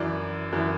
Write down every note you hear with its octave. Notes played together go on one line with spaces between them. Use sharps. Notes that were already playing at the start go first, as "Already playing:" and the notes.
Already playing: F#2 E3 D5
F#2 E3